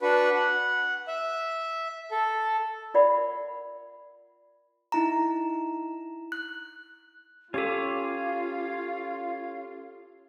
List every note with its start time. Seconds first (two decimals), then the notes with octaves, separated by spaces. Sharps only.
0.01 D4 F#4 B4
0.34 F#5
1.08 E5
2.11 A4
2.94 F4 A#4 D5 E5 F#5 B5
4.92 D#4 E4 A#5
6.32 F#6
7.54 C#4 F4 G4 A4 C#5 F5 D6